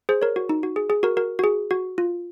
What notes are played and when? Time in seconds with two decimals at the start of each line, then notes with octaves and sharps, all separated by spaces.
0.09 G#4 C5
0.22 A#4 C#5
0.36 F#4
0.49 D#4
0.63 F#4
0.76 G#4
0.90 G#4
1.03 F#4 A#4
1.17 F#4 A#4
1.39 F#4
1.44 G#4
1.71 F#4
1.98 F4